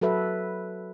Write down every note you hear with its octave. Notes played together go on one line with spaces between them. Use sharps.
F#3 F#4 A4 B4 E5